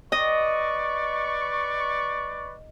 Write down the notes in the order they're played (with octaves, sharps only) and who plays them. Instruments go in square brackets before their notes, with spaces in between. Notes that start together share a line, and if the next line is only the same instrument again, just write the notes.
[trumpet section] B4 D5 C#6 [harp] D#5